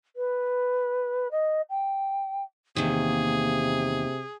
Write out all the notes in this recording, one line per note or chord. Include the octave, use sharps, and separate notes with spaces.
B4
D#5
G5
E2 C3 D#3 A#3 G#4